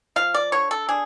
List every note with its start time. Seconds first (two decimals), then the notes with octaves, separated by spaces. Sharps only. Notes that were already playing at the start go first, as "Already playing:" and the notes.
0.16 F3 F5
0.34 D5
0.52 D3 C#5
0.71 A4
0.89 D4 G#4